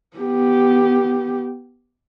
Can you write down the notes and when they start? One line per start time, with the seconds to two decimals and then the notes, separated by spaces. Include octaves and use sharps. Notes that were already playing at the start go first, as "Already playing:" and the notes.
0.17 B3 G4